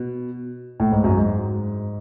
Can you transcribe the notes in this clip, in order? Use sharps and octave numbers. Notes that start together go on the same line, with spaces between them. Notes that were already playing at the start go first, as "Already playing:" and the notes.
Already playing: B2
A2
G#2
F#2
G#2